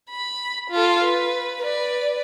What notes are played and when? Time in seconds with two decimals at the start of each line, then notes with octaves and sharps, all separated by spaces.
0.11 B5
0.71 F4 A4
1.03 B4
1.62 B4 D5